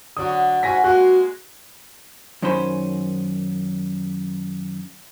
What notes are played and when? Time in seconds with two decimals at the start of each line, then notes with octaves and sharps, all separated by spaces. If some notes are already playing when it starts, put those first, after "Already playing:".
0.17 D3 F#3 F#4 D#6
0.63 G#2 F#4 G#5 A#6 B6
0.84 G#3 A#3 F#4 F#6
2.42 F#2 D#3 C#4 D#4 C5 B5